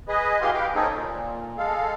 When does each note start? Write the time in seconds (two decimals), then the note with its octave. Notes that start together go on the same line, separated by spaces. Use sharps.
0.08 G#4 B4 D#5
0.41 E3 G#3 F#4 G4 F5 C6
0.53 G4 B4 F5 G5
0.75 A#3 C4 C#4 D#4 G#4 A4
0.90 A#2
1.57 G#3 A4 F5